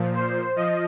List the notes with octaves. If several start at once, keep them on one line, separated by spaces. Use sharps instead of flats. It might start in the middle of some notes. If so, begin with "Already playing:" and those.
Already playing: A#2 F3
C5
F3 D#5